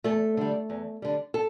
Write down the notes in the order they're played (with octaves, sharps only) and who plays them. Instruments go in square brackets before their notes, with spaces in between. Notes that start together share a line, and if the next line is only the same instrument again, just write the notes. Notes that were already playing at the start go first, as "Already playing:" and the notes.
[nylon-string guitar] E2 A3 A4
D3 G3
E2
D3 G3
A4